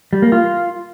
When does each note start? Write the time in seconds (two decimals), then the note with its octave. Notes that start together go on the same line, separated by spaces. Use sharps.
0.13 G3
0.22 A#3
0.32 F4